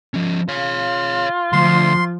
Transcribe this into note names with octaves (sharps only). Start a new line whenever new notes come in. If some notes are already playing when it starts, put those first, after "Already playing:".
F3 C#4
F4 C#5 F5
D2 F3 C6